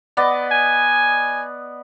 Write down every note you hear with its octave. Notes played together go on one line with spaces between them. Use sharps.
B3 D5 D#5
G#5